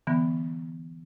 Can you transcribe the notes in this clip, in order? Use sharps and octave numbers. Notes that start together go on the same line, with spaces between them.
D3 E3 G3 B3